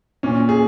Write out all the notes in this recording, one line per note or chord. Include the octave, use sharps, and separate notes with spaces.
A#2 C#4
G#4